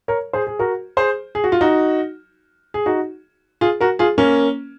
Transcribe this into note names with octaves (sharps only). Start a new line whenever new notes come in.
A#4 C#5
G#4 C5
G#4
F#4 A#4
G#4 C5
G#4
F#4
F4
D#4 F#4
G#4
D#4 F#4
F4 G#4
F#4 A#4
F4 G#4
A#3 C#4